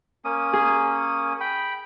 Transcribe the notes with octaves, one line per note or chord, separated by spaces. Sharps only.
A#3 C#4 D#6
G#4
G5 B5